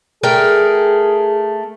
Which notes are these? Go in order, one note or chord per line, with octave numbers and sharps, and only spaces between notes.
A3 G#4 A#4 G5